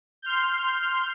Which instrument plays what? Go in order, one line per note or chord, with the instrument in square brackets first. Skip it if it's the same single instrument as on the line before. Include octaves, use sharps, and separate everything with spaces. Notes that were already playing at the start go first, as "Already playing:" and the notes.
[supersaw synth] C6 F6 G6